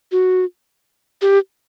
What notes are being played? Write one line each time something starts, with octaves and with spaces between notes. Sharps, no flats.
F#4
G4